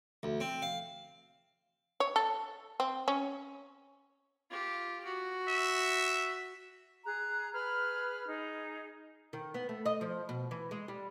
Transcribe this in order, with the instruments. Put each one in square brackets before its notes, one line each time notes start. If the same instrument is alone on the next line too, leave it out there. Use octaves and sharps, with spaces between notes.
[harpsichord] D2
C4
F5
[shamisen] C#5
A4
C4
C#4
[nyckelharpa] F4 G4
F#4
[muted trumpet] E5
[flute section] G#4 A#5 F#6
G#4 B4 B5 F6
D#4 G#4
[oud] D#3
B3
A3
D#5
F3
B2
E3
G#3
G3